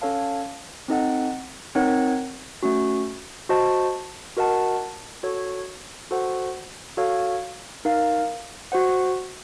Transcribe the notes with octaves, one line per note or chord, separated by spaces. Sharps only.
C#4 A4 C#5 F5 A5
C4 D#4 A4 D#5 F#5
C4 D#4 A#4 C#5 F#5
A3 C#4 F#4
F#4 C5 D#5 A5
F#4 A#4 D#5 F#5 A5
F#4 A4 C#5
F#4 A4 C5 F#5
F#4 A4 C#5 F5
D#4 A#4 F5
F#4 C5 F#5